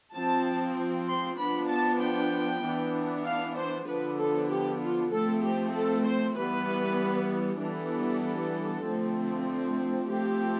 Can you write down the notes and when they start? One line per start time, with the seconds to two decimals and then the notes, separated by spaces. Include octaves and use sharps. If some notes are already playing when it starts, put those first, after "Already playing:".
0.14 F3 C4 A5
1.08 C6
1.38 F3 B3 D4 B5
1.69 A5
2.01 G5
2.64 E3 B3 D4
3.25 F5
3.56 C5
3.88 D3 F3 B3 D4 B4
4.18 A4
4.50 G4
4.81 F4
5.12 F3 A3 C4 A4
5.44 G4
5.74 A4
6.05 C5
6.36 E3 G3 B3 B4
7.60 E3 G3 B3 D4 A4
8.85 D3 F3 A3 C4
10.09 F3 A3 C4 G4